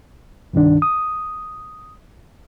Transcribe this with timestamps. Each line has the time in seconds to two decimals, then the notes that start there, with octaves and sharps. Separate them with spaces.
0.53 C2 G2 D#3 D4
0.82 D#6